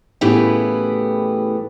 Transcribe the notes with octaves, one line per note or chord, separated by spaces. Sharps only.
A2 C#3 E3 B3 G4 B4